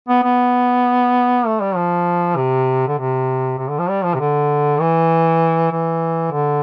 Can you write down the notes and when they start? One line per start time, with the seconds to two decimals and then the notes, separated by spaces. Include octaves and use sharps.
0.09 B3
0.24 B3
1.46 A3
1.61 G3
1.76 F3
2.36 C3
2.88 D3
2.98 C3
3.58 C3
3.69 D3
3.79 F3
3.90 G3
4.04 F3
4.15 C3
4.20 D3
4.80 E3
5.72 E3
6.32 D3